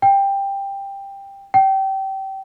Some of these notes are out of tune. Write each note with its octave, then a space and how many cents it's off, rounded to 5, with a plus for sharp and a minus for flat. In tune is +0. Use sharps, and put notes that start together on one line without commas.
G5 +10
G5 -25